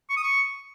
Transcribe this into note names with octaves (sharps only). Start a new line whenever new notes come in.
C#6
D#6
C#6